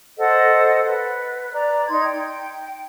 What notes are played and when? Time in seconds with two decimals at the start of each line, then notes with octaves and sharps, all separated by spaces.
0.18 A4 C5 D#5 F#5
0.86 B4
1.55 D5 A#5
1.88 D#4 C6 G#6
2.04 G5